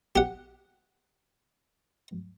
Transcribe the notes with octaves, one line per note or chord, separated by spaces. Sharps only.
G4 F#5